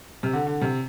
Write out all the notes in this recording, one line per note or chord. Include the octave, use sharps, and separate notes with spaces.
C3
D3
D3
C3